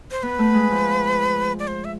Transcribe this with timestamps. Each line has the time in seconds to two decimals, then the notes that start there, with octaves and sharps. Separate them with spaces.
0.11 C5
0.23 B3 B4
0.39 A3
0.54 G#3
0.71 F3
1.59 D5
1.67 C5
1.84 E5